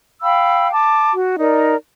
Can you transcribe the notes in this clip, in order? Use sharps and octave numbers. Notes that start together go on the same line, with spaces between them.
F5 G5 B5 E6
A5 D6
F#4
D#4 A#4 D5